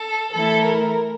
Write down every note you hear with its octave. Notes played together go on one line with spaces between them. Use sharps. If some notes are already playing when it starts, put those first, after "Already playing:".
Already playing: A4
E3 A3 E4 A4
A#4